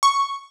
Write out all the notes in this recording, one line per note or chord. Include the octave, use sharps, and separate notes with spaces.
C#6